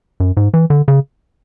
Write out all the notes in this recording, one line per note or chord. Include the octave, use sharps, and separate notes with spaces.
F#2
G#2
E3
D3
C#3